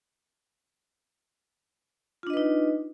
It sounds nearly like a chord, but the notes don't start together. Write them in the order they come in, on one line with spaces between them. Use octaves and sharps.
F4 D4 D#5 B4 D#4